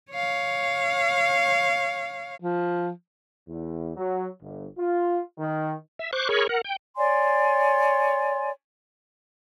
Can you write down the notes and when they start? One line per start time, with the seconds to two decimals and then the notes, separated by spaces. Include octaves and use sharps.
0.11 C#5 F5
2.42 F3
3.48 E2
3.96 F#3
4.41 G1
4.78 F4
5.38 D#3
5.99 E5
6.13 C5 C#6 D6 F#6
6.29 G#4 A#4 C#5 B5 C#6
6.49 A#4 F#5
6.64 G5
6.97 C#5 D5 G#5 C6